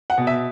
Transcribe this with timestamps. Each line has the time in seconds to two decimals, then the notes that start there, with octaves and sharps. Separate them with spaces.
0.10 F#5
0.18 B2
0.27 E5